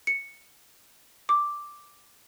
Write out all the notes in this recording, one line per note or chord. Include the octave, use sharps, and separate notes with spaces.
C#7
D6